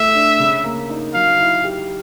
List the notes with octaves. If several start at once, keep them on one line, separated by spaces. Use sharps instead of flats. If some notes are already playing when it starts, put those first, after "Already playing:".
Already playing: A2 A3 E5
D4
C#3
A#3
D#4
F#3 F5
E4
G4